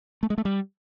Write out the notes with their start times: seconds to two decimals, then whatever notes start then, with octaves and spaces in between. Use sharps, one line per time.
0.23 A3
0.30 G#3
0.38 A3
0.45 G3